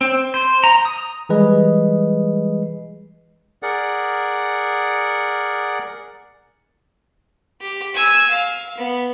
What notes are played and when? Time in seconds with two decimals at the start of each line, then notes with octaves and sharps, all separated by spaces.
0.01 C4
0.34 C5
0.64 A#5
0.85 D#6
1.29 E3 G3 G#3 G#4 B4 D#5
3.63 G#4 A#4 D5 F#5
7.61 G4
7.95 G#5 E6
8.30 F5
8.78 B3